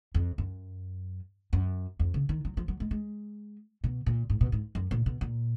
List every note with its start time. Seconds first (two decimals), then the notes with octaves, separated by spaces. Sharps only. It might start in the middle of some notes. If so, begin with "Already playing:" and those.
0.14 F2
0.38 F#2
1.53 F#2
1.99 F2
2.14 C#3
2.29 D#3
2.45 F#3
2.57 F3
2.68 F#3
2.80 G#3
2.91 G#3
3.84 B2
4.06 A#2
4.30 G#2
4.41 B2
4.52 G#2
4.75 F#2
4.91 A#2
5.06 B2
5.21 A#2